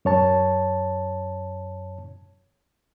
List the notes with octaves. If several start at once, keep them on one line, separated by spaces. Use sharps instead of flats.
F#2 C#5 A5